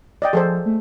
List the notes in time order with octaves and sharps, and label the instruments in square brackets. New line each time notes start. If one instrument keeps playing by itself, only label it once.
[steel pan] D5 D#5 G5
[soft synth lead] F3 [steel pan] G#4 A4 C5
[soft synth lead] A3